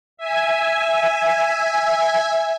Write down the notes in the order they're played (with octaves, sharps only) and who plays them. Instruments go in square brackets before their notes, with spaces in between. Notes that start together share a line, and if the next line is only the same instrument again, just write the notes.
[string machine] E5 G#5